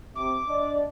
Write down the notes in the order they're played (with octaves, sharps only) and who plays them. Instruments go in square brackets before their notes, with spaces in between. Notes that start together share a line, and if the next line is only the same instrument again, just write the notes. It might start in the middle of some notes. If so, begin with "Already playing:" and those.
[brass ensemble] C3 [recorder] D6
[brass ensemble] D4 D5 D#5